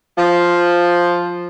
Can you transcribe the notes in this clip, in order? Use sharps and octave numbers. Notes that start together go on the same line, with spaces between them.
F3